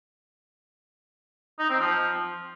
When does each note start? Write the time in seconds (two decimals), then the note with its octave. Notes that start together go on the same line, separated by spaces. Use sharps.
1.59 D#4
1.70 C4
1.80 F3